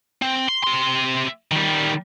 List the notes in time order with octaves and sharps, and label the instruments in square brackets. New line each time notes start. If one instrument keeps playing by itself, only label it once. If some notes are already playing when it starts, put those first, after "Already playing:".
[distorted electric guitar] C4
C6
C3 C6
D#3 G3